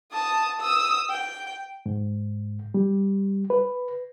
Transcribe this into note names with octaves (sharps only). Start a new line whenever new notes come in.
A5 D#6
D#6 E6
G5
G#2
G3
B4